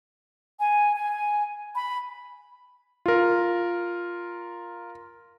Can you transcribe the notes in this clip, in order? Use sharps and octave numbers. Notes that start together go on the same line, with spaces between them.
G#5
G#5
B5
F4 A#4